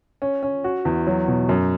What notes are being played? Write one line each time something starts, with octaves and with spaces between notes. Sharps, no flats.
C#4
C#4
F#4
E2
F#3
B2
F#2